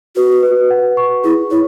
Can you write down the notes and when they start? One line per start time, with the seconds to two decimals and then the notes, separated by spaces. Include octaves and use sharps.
0.16 F#4 B4
0.43 B4
0.70 F#5
0.97 C#6
1.24 E4 G#4
1.51 E4 C#5